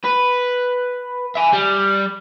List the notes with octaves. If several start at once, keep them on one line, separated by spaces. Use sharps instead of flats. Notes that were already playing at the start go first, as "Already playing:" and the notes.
B4
E5 G#5
G3